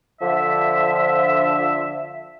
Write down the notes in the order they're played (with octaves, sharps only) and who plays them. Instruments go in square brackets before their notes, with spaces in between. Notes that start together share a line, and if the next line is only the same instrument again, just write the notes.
[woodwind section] D3 F3 E5